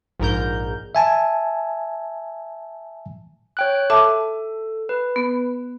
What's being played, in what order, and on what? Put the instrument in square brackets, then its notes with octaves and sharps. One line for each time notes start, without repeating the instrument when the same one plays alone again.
[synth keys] A#1 G#2 A#4 G6
[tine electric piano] E5 G#5 A5
[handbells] C#5 G5 F#6
[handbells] A4 [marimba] E5 A5 D6
[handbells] B4
[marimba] B3